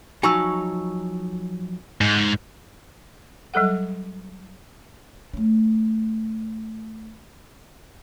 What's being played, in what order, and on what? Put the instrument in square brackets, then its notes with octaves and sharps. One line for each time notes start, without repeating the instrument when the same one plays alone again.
[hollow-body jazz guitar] F3 F#3 D#4 [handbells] G#5 C#6 E6
[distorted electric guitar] G#2
[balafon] F#3 G3 A4 F#5
[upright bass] A3 C#4